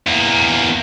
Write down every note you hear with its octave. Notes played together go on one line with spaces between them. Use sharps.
E2 A#3